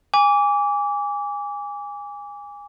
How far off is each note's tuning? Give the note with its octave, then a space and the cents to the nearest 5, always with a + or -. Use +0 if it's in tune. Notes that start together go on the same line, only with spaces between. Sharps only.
G#5 -25 D6 -25